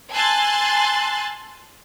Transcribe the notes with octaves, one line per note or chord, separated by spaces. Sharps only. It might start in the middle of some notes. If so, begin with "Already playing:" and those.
G#5 A5 C6 E6 F#6 A6